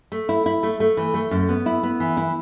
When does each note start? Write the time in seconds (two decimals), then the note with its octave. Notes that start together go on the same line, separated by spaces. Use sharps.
0.12 A3
0.29 E4
0.46 E4
0.63 A3
0.80 A3
0.97 E3
1.14 A3
1.31 F#2
1.49 B3
1.66 E4
1.83 B3
2.00 E3
2.17 E4